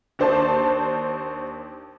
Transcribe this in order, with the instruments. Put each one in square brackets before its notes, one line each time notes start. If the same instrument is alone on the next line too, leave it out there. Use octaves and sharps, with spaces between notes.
[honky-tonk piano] D#2 D4 C5 A5